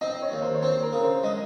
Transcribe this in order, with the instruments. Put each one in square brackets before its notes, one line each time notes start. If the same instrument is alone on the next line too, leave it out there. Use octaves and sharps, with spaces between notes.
[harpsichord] C4 [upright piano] D#5
[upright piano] C#5
[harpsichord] D#2
[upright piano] C5
C#5
[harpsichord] C4 [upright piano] C5
[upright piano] A#4
[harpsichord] C#3
[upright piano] C5
[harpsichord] G#3 [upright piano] D#5